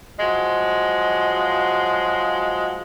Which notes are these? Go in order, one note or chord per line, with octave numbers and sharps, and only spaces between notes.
F3 F#3 G#3